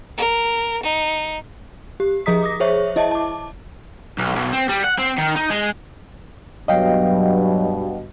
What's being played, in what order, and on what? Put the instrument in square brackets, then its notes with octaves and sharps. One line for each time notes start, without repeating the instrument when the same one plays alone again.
[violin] A#4
D#4
[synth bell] G4
F3 G#4 D#5 A#5 D#6 B6
D6 D#6 A#6
G#4 C5 C#5 E5 C#6
E4 D#5 E5 A5
A5 D6
[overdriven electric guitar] B1
B1
C4
G3
F#5
C4
D#3
D#4
G#3
[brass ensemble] G2 B2 [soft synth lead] F#3 [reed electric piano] D#5 F5 G5